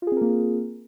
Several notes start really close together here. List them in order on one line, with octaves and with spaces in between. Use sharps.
F4 G#4 C4 A#4 A#3